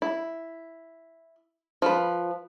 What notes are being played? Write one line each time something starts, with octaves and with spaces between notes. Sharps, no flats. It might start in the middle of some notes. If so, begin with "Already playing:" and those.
E4
F3 B4